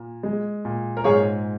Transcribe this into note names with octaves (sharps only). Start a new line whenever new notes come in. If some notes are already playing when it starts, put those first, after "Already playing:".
Already playing: A#2
G#3
A#2
A#4
G#2 G#4 C#5